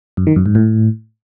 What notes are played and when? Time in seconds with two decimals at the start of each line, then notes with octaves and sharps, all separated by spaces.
0.17 F#2
0.27 D#3
0.36 F#2
0.46 G#2
0.55 A2